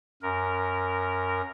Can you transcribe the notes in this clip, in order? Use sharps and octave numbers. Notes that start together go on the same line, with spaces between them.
F#2 A#4